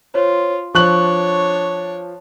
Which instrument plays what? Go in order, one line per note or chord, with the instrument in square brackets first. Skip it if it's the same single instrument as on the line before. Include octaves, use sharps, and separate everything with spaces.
[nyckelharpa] F4 [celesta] C5 C#5
[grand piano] F3 F#6 F#7 [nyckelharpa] D4 C#5 [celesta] C#6